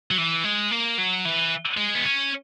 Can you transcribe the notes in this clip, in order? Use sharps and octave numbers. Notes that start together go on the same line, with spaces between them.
F#3
E3
G#3
A#3
F#3
E3
G#3
B3
C#4